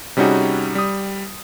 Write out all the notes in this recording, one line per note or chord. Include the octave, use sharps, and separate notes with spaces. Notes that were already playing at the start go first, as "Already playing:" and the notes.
C3 G3 C#4 D#4 F#4 G#4
G3 D#6